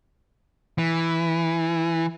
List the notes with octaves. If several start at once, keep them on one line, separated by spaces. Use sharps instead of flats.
E3